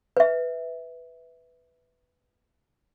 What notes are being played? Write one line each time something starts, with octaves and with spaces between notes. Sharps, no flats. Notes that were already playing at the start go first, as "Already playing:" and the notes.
B4 E5